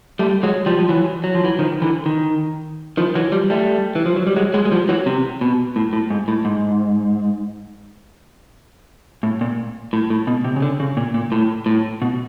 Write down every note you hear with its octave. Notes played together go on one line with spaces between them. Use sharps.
G3 A3
F#3 G#3
F3 G3
F3
E3 F#3
F#3
F3
E3 F#3
D#3 F3
D3 E3
D#3
D#3 F3
E3 F#3
F3 G3
G3 A3
E3
F3
F#3
G3
F#3 G#3
F#3 G#3
G#3
F3 G3
E3 F#3
C3
B2
A2
A2
G#2
A2
G#2
A2
A#2
A2
A2
B2
C3
C#3
D3
C#3
A#2
A#2
A2
A2
B2